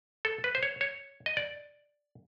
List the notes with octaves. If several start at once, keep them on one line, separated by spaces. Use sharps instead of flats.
A4
B4
C5
C#5
C#5
D#5
D5